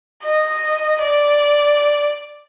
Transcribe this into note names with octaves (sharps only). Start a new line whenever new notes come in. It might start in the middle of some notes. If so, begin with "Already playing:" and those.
D#5
D5